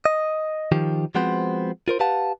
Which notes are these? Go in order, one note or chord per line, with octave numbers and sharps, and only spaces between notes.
D#5
D#3 F3 G4
F3 G#3 B3 C4 F#4 C5
F4 A#4 C5
G4 B4 F5 F#5 A5